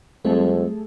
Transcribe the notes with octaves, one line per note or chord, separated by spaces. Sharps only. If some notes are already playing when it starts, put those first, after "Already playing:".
F2 F#3 G3 A3 C4 G#4 A4